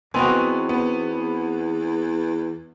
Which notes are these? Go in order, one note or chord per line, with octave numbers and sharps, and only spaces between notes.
E2 B3 C4 D#4 F#4 G#5
B3